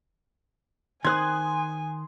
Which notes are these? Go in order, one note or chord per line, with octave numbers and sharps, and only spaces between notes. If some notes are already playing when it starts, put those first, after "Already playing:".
D#3 C5 G#5 C6 D#6 F#6 G#6